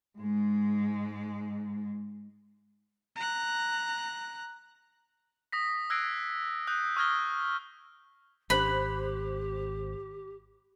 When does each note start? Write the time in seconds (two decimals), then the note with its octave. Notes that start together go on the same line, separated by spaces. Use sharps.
0.18 G#2 G#3
3.16 A#5 F#6
5.52 D#6 A#6 B6
5.90 E6 F#6 G#6 A#6 C7 D7
6.67 D#6 F#6 G6
6.96 C#6 D#6 F6 G#6 A#6 G7
8.50 G#1 G4 C5 B5 F#6